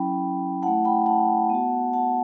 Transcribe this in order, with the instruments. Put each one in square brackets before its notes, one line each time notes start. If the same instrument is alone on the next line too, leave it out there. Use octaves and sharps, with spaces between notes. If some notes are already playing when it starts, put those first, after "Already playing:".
Already playing: [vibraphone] F#3 C#4 E4 G5 B5
A3 E4 F#5 A5
G5 B5
F#5 A5
B3 F#4
F#5 A5